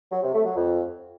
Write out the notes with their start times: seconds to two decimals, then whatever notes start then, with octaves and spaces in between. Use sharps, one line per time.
0.12 F#3
0.23 C3
0.34 A3
0.45 F#3
0.56 F2